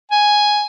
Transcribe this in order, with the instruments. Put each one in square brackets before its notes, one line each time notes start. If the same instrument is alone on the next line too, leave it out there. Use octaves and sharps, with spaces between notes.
[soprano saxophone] G#5